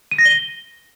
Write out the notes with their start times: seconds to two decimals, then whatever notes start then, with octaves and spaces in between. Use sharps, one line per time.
0.11 D#7
0.18 A#6
0.25 G7